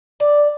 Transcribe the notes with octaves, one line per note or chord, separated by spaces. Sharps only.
D5